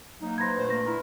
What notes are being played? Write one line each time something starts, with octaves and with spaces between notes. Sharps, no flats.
F#3 A#3 D#4
E4 B4 C5 G#6 A#6
A#2 D3 A3 C5
A#3 A#6
E4 A#4